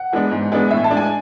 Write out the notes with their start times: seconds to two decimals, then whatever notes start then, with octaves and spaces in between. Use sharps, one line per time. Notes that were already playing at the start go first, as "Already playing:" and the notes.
Already playing: F#5
0.12 E3 G#3 B3 D4
0.31 G#2
0.52 E3 G#3 B3 D4
0.71 A2 E5
0.84 A5
0.90 G#3 D4
0.97 G#5